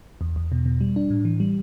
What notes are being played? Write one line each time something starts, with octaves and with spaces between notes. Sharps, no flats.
E2
E2
B2
B2
G3
D4
A2
E3
G3